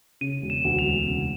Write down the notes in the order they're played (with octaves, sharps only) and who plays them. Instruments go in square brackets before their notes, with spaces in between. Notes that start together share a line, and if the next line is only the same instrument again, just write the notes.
[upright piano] C#3 [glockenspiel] D#7
[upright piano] E1
[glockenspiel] E7
[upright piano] D2
[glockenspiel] F7
[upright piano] E1
C#3